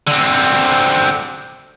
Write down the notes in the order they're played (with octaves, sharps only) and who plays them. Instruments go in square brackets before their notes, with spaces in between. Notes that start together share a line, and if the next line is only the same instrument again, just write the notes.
[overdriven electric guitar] D3 C4